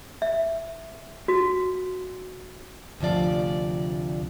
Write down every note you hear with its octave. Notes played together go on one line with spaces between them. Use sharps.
E5
F#4
D2 C3 F3 D5